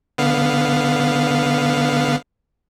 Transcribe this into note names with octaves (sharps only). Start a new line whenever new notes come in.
D3 B3 F5